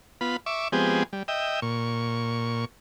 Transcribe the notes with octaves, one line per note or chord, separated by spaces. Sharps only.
B3 F4 B5
E5 C#6 D6
F3 G#3 B3 C4 G4 G#4
G3
D#5 E5 G5
A#2 C#6